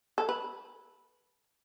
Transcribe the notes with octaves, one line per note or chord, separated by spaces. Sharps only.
A4
B4